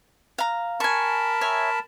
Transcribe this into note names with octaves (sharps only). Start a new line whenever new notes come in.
F5 A#5
A#4 G#5 A5 B5 C#6
C#5 E5 G#5